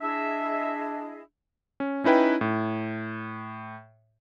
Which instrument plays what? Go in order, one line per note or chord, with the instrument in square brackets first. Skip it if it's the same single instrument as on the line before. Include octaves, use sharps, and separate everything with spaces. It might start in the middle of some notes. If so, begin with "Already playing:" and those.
[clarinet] D4 [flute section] E4 G#4 D#5 [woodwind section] E5
[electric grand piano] C#4
C#4 D#4 E4 B4 G5
A2